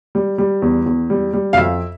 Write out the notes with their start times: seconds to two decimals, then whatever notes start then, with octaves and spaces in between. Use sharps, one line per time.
0.15 G3
0.38 G3
0.62 E2
0.86 E2
1.10 G3
1.33 G3
1.53 F5
1.57 F2 E5